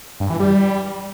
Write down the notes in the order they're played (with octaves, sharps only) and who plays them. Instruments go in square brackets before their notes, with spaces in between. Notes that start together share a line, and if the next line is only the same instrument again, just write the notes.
[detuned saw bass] G2
E3
G3